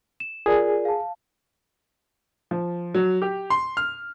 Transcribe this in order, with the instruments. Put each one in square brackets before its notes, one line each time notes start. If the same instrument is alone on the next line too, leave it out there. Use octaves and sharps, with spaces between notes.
[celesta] E7
[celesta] F4 A#4 D5 [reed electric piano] G#4
[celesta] F5 A5
[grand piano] F3
F#3
G4
C6
F6